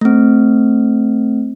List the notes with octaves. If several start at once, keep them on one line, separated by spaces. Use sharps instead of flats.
A3 C4